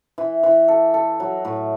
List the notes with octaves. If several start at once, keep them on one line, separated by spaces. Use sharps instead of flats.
E3
E3
A4
A4
F#3
A2